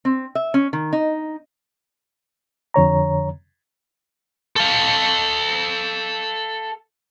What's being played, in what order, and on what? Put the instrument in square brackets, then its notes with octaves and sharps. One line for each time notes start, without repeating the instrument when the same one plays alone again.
[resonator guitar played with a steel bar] C4
E5
C#4
D#3
D#4
[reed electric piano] F2 D3 C#5 A#5
[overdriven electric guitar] A4 F5